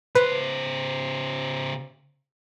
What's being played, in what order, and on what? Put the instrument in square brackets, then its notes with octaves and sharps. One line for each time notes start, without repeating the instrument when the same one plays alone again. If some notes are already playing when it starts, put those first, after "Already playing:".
[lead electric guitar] C#3 C5 [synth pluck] B4